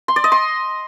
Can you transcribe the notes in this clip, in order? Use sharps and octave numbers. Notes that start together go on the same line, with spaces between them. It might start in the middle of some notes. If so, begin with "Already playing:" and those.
C6
D5
D#5
C6